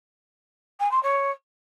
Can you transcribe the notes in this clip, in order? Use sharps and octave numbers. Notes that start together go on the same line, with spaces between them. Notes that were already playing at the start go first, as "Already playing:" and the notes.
G#5
C6
C#5